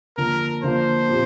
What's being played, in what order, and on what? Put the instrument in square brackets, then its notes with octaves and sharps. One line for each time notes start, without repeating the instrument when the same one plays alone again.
[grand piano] D3 F3 A#3 D4 F4 [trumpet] A#4
[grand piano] D3 F3 A#3 D4 F4 [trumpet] C5
[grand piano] A#2 F3 C4 G4